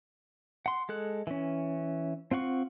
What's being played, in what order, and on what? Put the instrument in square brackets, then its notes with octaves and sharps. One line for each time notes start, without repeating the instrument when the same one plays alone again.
[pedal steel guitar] F#5 C6
G#3 A4 F#6
E3 C#4
C4 F4 F#5 C#6